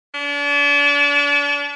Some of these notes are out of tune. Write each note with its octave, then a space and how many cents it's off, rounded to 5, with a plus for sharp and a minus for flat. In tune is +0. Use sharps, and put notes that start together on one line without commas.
D4 -35